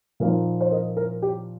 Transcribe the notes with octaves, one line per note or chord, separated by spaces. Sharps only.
A#2 F3 A#3 D#4 A#4
C5
A#4 D#5
A#4
G4